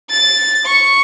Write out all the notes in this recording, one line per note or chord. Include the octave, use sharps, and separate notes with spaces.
A6
C#6